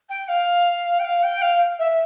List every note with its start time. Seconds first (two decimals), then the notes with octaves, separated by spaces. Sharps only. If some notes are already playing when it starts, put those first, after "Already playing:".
0.09 G5
0.28 F5
0.99 G5
1.04 F5
1.22 G5
1.41 F5
1.79 E5